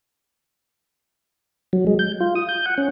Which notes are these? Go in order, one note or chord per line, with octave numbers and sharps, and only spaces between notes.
F#3
G#3
G6
F4
D#6
G6
F#5
C#4